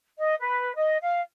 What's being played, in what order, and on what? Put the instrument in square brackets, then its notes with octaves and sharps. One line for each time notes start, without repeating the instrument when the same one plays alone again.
[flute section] D#5
B4
D#5
F5